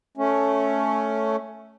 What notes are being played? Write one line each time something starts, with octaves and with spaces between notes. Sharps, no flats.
A3 C#4